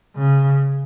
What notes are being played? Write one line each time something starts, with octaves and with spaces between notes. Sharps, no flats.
C#3